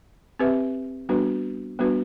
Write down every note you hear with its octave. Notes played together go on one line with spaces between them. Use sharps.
C4 G4 B4 E5
G3 B3 D4 F#4 B4
G3 B3 D4 F#4 B4